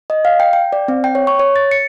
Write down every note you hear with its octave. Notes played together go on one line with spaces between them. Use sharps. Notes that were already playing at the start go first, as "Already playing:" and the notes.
D#5
F5
G5
G5
D5
C4
G5
C#5
C#6
C#5
A6
C#7